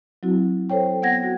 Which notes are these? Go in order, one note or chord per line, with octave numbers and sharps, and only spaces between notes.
F#3 C4 E4 F#4
A4 C5 C#5 G5
B3 F#5 G#6 A#6
F#4